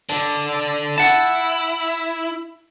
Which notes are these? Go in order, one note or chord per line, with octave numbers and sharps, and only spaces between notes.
D3 D4
E4 F#5 A5